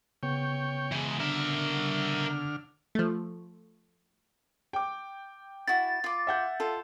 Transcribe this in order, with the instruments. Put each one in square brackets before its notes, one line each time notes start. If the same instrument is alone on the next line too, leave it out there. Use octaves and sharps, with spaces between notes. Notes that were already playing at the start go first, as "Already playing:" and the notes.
[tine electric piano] C#3 B3 [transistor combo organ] C#5 G5
[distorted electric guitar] E3 G#3
[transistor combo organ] D3 F6 [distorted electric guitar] A#4 E5
[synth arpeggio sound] F3 A3
[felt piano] G5 D6
[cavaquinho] E4 F#4 [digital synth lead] A6
[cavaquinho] F4 D6
[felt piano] E5 F#5 G6
[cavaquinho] F4 A4